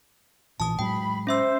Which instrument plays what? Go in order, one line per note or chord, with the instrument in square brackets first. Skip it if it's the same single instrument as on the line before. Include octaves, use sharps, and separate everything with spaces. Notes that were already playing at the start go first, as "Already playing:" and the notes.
[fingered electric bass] A#1 A#2 E3 [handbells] A5 D#6
[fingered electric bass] A2 F#3 G#3 [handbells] G5 [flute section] B5
[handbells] C#4 E5 E6 [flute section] C5